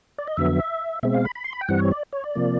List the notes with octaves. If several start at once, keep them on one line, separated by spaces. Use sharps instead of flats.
D5
D#5
F2 D3 F#3 B3 E5
B2 G#3 C4 E5
F5
B5
B5
C6
B5
G5
G2 E3 G3 C4 F#5
C#5
D5
C#5
D5
C3 F3 A#3